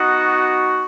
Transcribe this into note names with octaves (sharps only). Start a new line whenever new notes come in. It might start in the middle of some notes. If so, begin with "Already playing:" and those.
Already playing: B3 D#4 F#4